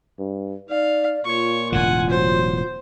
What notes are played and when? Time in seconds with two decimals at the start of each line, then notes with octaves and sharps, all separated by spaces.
0.19 G2
0.70 D#4 D5 F5
1.25 A#2 F4 C#5 C#6
1.72 E1 A2 D3 F#5 G#5
2.10 F#3 C5